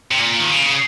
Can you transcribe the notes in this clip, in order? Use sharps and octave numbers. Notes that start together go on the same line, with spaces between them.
C3
A#2
D#3
C#3